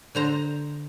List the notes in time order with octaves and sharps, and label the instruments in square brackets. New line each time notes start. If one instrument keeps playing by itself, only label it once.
[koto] D3 C5 A#5